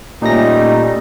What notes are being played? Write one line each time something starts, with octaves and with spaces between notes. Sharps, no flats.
A#2 G3 A3 C#4 D#4 A#6